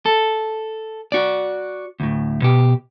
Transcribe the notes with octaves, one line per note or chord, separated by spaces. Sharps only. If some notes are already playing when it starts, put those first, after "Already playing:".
A4
F#4 D5
D2 A2
B2 G4